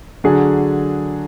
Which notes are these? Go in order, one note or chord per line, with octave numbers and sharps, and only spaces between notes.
D3 F#3 D4 G#4